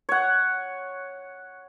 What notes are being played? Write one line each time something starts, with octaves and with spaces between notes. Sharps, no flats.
C#5 F#5